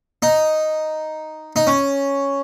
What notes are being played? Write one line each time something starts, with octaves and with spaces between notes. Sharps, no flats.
D#4
D#4
C#4